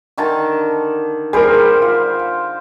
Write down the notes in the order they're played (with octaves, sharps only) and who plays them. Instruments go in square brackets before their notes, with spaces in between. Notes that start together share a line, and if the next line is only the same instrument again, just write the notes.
[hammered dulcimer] D3 D#3 A5
[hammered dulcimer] G3 C5 [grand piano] G#4 A#4
[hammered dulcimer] F4